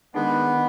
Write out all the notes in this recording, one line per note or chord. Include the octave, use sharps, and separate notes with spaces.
D#3 G#3 B3 D4
D#3